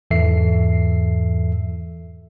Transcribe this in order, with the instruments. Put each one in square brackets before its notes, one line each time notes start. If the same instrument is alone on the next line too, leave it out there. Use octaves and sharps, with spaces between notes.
[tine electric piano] E2 G#2 E3 A4 E5 C7